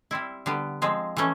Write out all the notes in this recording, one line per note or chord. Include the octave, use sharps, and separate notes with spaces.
G3 C4 E4
D3 G3 B3
F3 G#3 C4
E3 A3 C#4